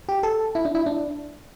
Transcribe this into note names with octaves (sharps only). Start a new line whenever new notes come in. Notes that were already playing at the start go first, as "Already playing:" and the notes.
G4
A4
E4
D4
E4
D4